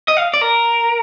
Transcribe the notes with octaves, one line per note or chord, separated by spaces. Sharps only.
D#5
F5
D5
A#4